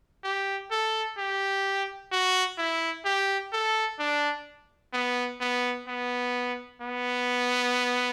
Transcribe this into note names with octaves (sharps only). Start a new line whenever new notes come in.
G4
A4
G4
F#4
E4
G4
A4
D4
B3
B3
B3
B3